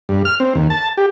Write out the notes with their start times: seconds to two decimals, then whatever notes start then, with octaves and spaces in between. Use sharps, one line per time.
0.09 G2
0.25 F6
0.40 C4
0.55 D#2
0.70 A5
0.97 G4